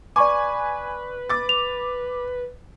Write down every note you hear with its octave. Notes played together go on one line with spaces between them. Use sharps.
B4 D5 G#5 C#6 D6
D6 A6
F7